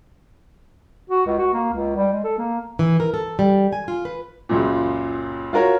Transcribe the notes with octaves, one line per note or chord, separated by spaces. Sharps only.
F#4
C#2
F#4
A#3
C#2
G3
G#3
A4
A#3
E3
A#4
A4
G3
G#5
F4
B4
C#2 F#2 A#2
F4 F#4 A#4 C#5